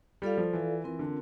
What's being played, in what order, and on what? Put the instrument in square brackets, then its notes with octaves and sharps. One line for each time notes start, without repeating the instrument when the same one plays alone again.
[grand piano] G3 [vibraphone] F4 A4 D5 F5
[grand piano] F3
E3
[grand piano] E3 [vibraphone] C4 F4 A#4
[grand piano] D3